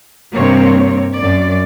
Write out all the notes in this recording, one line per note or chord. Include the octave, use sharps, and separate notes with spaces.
G2 C3 A#3 C4 C#5
F#2 D5